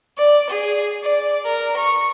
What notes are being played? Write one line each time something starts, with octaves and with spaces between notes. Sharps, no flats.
D5
G#4
D5
A#4
C#6